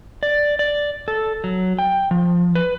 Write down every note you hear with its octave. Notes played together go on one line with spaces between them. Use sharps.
D5
D5
A4
F#3
G5
F3
B4